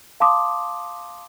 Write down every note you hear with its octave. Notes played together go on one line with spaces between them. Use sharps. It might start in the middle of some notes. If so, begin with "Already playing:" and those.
F5 A5 C6 D6 D#6